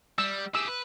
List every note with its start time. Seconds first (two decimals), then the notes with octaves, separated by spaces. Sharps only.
0.18 G3 E6
0.55 G4 G#4 E6
0.68 B4